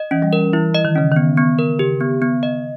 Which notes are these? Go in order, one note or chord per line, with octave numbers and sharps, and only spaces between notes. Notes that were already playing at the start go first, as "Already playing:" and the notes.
Already playing: D#5
E3 C#4
G3
A#4
E3 E4
D#5
D#3
C#3 C#4
D#3
B3
B3
A#4
C#3 G4
B3
B3
D#5